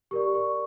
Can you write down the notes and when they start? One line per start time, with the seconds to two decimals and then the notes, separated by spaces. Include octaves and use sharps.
0.11 G4 A#4 D5 C#6
0.35 C#6